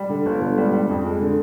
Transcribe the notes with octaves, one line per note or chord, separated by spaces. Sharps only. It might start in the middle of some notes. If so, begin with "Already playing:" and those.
Already playing: G3
D3
G1
D3
G3
G3
F2
G#3
D3